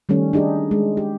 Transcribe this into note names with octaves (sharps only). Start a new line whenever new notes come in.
D#3 G3 A3 C#4
D4 D#4 G4 G#4
G#3
G4